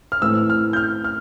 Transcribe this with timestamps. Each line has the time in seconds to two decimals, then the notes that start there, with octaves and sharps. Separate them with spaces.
0.12 F6
0.21 A2 E3 A3 C4 E6
0.50 F6
0.73 G6
0.77 F6
1.04 F6